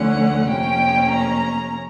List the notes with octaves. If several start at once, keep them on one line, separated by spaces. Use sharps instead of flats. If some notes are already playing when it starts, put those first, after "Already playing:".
Already playing: D2 D3 F3 A3 C#4 F#5
F2 C3 F3 A#3 C#4 G5
A#5